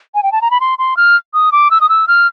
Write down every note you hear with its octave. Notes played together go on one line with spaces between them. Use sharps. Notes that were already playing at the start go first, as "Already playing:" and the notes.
G#5
G5
A5
A#5
B5
C6
C6
F6
D#6
D6
E6
D#6
E6
F6